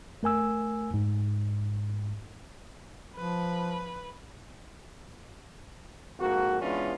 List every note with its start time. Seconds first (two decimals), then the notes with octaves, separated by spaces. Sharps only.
0.23 A3 A#4 G#5 E6
0.94 G#2
3.16 F3 B4
6.19 F2 G#2 A#3 F#4
6.61 E3 G#3 B3 C#4 D4 F4